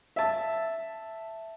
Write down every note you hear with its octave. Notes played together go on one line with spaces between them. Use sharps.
E5 A5